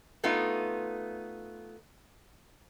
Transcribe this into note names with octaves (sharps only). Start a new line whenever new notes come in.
A3 B3 D#4 F4